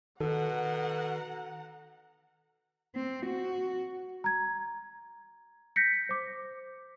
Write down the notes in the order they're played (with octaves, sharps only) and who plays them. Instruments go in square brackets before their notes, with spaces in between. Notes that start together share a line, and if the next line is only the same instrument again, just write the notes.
[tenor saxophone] B2 [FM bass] D#3 [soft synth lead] A4 [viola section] F#5 A#5
[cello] C4
F#4
[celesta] A#5 G#6
G6 A#6 B6 C#7
C5 D6